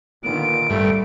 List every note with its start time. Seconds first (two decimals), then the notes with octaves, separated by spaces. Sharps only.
0.24 A#2 D3 D#3 B3 D7
0.70 A1 G2 G3 A3